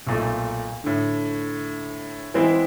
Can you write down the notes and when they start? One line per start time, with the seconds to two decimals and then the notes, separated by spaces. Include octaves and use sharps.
0.07 B1 A#2 A3
0.84 A2 D3
2.34 E3 G#3 B3 C4 E4